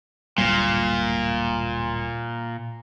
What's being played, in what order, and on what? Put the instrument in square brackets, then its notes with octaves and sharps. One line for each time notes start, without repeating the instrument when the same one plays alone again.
[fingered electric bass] D1 G1 G3 [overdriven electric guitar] A#2